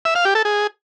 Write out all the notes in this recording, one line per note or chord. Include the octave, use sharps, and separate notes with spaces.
E5
F5
G4
A4
G#4